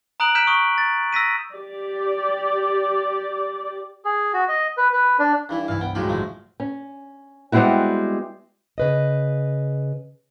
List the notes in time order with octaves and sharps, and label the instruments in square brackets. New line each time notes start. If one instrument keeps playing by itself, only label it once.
[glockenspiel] A#5 D#6 F#6 D7 F#7
F6 G6 B6 D7 E7
C#6 D#6
A6
E6 A#6 B6 D#7
[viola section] G4 D5
[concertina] G#4
F#4
D#5
B4
B4
D4
[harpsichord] G2 E3 E4
[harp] C2 G2 [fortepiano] E3 [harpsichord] E4 F5
[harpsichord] B3 [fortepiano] G5
[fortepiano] A2 F#3 G#3 [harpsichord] F4 G4 B5
[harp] A1 [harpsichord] F3 A3
[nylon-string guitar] C#4
G3 G#3 B3 C4 E4 F#4
[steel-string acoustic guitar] C#3 B4 D#5